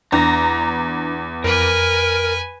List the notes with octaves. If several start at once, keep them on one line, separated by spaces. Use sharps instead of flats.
E2 D4 A#5
F2 A#4 B4 G#5